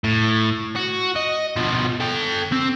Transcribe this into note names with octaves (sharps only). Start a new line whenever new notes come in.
A2
F#4
D#5
B2 F3
A4 G5
C4